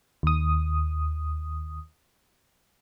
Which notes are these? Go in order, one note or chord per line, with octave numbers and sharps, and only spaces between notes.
D#2 D#6